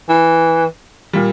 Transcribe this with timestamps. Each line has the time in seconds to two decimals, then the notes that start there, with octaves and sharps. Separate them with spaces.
0.09 E3
1.13 A#2 G3